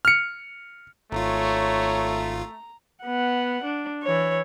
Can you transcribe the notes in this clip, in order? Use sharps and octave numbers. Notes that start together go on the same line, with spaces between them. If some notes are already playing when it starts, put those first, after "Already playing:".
F6 C#7
G#1 A3 F4 C#5 A#5
B3 F#5
D4
E3 C#5